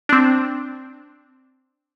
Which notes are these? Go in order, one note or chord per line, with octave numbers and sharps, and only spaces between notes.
C4 D4